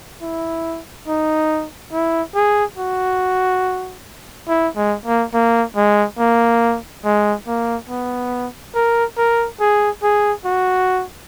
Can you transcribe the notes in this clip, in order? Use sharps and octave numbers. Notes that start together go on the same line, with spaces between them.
E4
D#4
E4
G#4
F#4
E4
G#3
A#3
A#3
G#3
A#3
G#3
A#3
B3
A#4
A#4
G#4
G#4
F#4